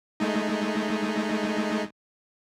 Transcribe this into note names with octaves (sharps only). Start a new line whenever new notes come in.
G#3 A3 D#4